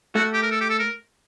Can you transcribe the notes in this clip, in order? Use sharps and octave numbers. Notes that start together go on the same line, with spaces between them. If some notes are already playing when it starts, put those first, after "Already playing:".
A3 F#4
G4
A#4
A4
G4
A4
A#4